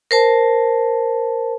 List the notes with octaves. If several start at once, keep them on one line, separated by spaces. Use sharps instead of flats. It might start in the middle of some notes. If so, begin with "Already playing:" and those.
A#4 C5 A5